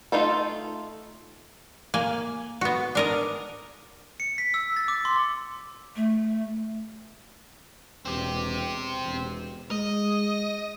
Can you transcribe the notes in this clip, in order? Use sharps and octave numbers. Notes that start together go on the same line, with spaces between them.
A3 D#4 F4 A4
A#3 G#5
B3 F#4
D4 A#4 D#5
C#7
B6
E6
A6
D6
C6
A3
E1 C4 G4
E1
G#3 D#5